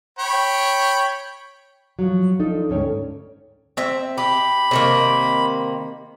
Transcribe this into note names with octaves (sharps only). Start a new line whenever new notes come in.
C#5 G5 B5
F3 F#3
F3 D4 D#4 A4
D2 G#2 C#4 A4 C#5 G5
C4 E5
G4 B5
C3 D#3 A#3